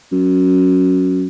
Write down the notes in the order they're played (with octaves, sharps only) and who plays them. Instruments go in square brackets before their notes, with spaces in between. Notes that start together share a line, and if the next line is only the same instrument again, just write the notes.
[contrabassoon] F#2